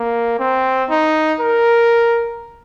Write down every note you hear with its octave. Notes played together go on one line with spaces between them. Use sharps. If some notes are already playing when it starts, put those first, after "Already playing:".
Already playing: A#3
C4
D#4
A#4